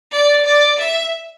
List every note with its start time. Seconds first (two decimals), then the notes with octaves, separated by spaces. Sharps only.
0.11 D5
0.45 D5
0.79 E5